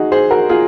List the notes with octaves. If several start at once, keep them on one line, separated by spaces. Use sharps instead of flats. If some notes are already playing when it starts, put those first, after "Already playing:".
Already playing: D#4 F#4 G#4
G#4 C5
F#4 A#4
F4 G#4